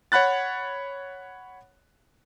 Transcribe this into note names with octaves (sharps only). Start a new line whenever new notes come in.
C#5 F#5 B5 F#6 A6